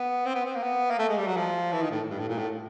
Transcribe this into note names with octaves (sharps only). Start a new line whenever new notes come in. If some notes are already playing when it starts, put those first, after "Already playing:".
Already playing: B3
C4
B3
C4
A#3
B3
A#3
A3
G#3
G3
F#3
F3
E3
D#3
A2
G2
A2
A#2
A2